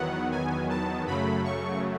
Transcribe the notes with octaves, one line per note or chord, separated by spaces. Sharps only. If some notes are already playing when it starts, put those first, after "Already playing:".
Already playing: E2 D#3 F#3 B3 F#5
G#5
A5
F#2 C#3 F#3 A3 B5
C#6